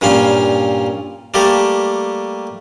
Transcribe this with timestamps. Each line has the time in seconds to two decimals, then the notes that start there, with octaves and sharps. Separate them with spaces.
0.01 G2 A#2 G3 C#4 F5
1.34 G3 A3 A#3 G4 A4